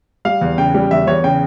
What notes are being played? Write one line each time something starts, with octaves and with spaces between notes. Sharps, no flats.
G3 F5
E2
C#3 G5
G3
E2 E5
E2 C#5
C#3 G5